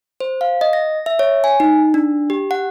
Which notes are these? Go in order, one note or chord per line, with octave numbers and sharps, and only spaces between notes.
C5
F5
D#5
A#6
E5
C#5
G#5
D#4
D4
G4
F#5